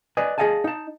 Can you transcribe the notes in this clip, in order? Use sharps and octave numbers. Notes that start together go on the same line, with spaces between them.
B4 D5 D#5 G#5
G#4 A#4 D#5 F5 G#5 A5
D#4 A5